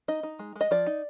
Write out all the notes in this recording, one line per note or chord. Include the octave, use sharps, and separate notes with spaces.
D#4 D#5
D#4
G#3
G#3
D#5
F3 D5
D#4